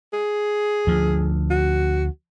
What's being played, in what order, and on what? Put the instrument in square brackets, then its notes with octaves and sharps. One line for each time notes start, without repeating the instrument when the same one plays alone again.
[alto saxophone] G#4
[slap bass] D2 F3
[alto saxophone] F#4